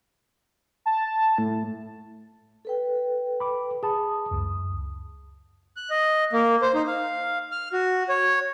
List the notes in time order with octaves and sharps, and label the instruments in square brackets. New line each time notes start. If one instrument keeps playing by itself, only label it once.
[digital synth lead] A5
A2
[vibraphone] A4 B4 G5
[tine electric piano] B5 D6
[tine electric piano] G#4 A5 B5 [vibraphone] D#6
[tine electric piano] C#2 F#2
[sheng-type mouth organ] F#6
D#5
A#3
C5
D#4
F5
F6
F#4
C#5